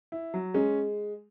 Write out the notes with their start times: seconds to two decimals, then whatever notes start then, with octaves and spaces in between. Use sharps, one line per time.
0.12 E4
0.34 F#3
0.54 G#3 C#4